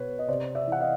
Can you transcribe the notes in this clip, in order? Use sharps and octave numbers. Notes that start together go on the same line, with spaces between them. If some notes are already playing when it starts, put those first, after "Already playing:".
Already playing: B2 B4 C#5
D#5
C3 C5 D5
D5 E5
E3 F#5
D#5 F5